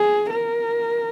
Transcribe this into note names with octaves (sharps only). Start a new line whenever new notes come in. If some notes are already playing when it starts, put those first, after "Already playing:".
Already playing: G#4
A#4